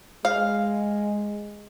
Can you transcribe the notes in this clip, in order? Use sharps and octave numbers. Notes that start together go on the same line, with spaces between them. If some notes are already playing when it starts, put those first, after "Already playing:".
G#3 F5